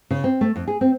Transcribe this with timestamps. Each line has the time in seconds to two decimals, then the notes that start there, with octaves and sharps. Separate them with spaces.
0.11 C#3
0.24 C4
0.41 A3
0.56 F2
0.68 G#4
0.81 C4